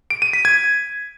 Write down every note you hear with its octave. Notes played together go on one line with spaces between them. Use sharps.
D7
D#7
B6
G#6